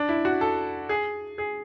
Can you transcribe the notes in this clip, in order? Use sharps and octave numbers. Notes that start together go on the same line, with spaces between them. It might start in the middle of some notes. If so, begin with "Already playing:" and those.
Already playing: D4
E4
F#4
A4
G#4
G#4